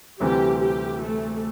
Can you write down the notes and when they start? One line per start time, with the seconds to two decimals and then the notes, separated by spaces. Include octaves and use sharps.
0.20 D2 C3 E3 G3 C4 G4
0.61 G4
1.02 A3